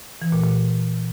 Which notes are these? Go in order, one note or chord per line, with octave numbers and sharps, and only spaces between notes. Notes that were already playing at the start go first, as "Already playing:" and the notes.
E3
A#2
A#2